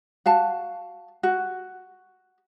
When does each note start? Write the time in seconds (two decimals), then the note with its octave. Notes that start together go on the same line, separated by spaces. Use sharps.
0.26 F#4 F5 A5
1.23 F#4